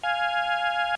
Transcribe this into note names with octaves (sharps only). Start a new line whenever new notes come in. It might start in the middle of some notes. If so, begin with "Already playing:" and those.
F5 G#5